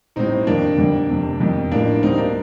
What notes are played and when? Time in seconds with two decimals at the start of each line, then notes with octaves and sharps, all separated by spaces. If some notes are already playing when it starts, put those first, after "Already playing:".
0.16 A1 A2 G3 C4 D#4
0.47 F2 D#3 G3 A#3 D4
0.78 F2 D3 G3
1.09 F1 F2 C3
1.40 F2 D#3 G3
1.72 A1 A2 F3 A#3 D4
2.03 D2 D3 G3 C4 D#4
2.17 A#3 D4